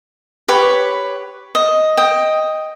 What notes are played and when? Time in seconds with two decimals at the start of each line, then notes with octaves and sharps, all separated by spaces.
0.48 G4 B4 C#5
1.55 D#5
1.97 D#5 G5